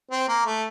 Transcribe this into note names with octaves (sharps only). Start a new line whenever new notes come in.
C4
A#3
A3